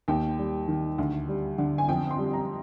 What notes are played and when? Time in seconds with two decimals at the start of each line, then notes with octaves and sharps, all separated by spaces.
0.08 D#2 G5
0.38 G3
0.68 D#3
0.98 D2
1.28 G3
1.58 D3
1.78 G#5
1.89 F2 G5
2.10 C6
2.18 G3
2.33 A#5